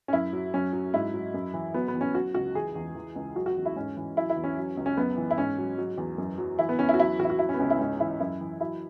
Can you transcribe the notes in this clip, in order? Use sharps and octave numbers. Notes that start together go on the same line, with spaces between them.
C#4
F#2 E4
F#3
F#2 C#4
F#3
G#2 E4
F#3
F#2
E3
F#3 B3
B3
E2
C#4
F#3 F#4
C#2 F#4
E3 G#4
E2
E3
C#2
F#3 F#4
F#4
E2
E4
G#2 C#4
E3
F#3 E4
E4
E2
C#4
F#3
C#2
C#4
F#2 B3
E3
E4
G#2 C#4
F#3
F#3
E2
F#2
F#3
E3 E4
B3
E2 C#4
E4
F#4
F#3 E4
E2 F#4
E4
F#4
F#3 E4
C#4
B3
C#2 C#4
E4
G#2 C#4
E3 E4
F#2 E4
E3
F#3 E4